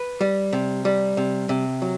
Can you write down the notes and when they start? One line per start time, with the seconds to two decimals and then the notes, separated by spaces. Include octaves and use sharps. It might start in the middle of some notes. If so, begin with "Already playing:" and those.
Already playing: B4
0.21 G3
0.53 C3
0.85 G3
1.17 C3
1.49 C3
1.82 F#3